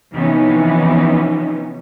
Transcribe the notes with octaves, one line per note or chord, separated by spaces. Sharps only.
C3 E3 F3 B3 C#4 D#4